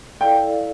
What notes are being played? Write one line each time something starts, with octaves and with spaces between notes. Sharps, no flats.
E4 A4 D5 F5 G5